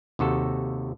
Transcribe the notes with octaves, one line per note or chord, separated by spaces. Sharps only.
D#2 C3 F#4 A4